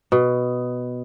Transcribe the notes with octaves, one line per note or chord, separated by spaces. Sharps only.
B2